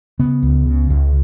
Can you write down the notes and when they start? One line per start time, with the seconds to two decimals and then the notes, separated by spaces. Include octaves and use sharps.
0.19 C#3 B3
0.43 C#2
0.67 C#3
0.90 C#2